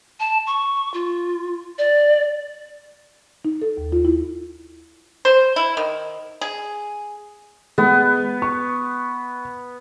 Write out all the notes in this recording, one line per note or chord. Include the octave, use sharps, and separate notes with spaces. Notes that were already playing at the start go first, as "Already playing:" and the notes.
A5
C#6
F4
D5
D#4
A4
D#2
F4
E4
C5
E4
D#3
G#4
G#3 B3 G#4
C#6